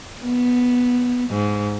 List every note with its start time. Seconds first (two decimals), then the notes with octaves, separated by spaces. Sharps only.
0.21 B3
1.30 G#2